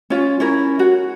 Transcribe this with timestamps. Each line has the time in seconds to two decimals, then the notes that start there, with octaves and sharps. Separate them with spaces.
0.10 C#4 F4
0.40 C#4 E4 A#4
0.79 F#4